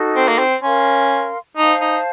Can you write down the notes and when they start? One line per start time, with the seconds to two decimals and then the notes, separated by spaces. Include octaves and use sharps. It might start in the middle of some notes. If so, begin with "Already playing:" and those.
Already playing: D#4 F#4 A4
0.15 C4
0.28 A#3
0.39 C4
0.62 C#4 A#4 F5 C6
1.57 D#4 C5 F5 A5
1.81 D#4